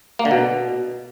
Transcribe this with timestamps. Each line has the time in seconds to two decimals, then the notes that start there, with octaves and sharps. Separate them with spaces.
0.19 A#3
0.25 D3
0.31 B2